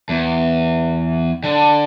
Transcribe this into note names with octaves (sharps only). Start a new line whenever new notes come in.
E2
D3